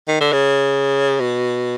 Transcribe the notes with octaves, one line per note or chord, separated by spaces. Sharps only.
D#3
D3
C#3
B2